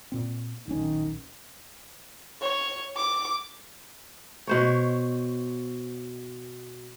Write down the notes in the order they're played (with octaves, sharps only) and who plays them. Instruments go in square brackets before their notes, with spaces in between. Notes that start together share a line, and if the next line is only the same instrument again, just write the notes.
[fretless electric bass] A#2 C4
[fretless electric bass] D1 A#1 C#4 [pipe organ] D#3
[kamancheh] C#5
D6
[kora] B2 C5 C#5